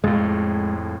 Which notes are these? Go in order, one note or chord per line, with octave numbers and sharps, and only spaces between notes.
F2 A2 G#3